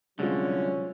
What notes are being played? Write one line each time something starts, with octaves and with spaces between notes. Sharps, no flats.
C2 D3 F#3 G#3 C4 C#4 F4